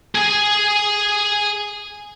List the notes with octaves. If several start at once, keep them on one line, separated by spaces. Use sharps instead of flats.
G#4 G#5